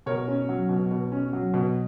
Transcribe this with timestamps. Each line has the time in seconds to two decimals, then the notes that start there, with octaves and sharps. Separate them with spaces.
0.06 B2 A#4 C#5
0.28 C#4
0.49 F#3
0.69 B2
0.91 B2
1.12 C#4
1.33 F#3
1.54 B2